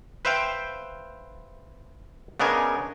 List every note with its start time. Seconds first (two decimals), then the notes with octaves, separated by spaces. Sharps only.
0.25 B4 C5 E5 F5 G5
2.40 C#3 B3 D4 A#4 D#5 G#5